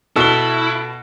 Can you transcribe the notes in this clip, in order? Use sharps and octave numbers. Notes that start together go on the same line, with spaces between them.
B2 E4 A4 G7